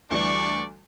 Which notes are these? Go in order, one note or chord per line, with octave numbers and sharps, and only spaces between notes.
D2 E3 G3 D4 D5 C#6